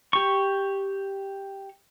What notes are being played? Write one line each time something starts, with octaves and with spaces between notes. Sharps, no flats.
G4 C#6